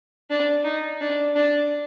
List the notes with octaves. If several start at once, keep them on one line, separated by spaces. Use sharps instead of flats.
D4
D#4
D4
D4